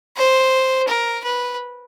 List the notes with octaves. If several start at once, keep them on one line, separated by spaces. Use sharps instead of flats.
C5
A#4
B4